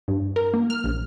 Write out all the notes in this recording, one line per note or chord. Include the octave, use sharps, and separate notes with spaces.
G2
A#4
A#3
F6
A#1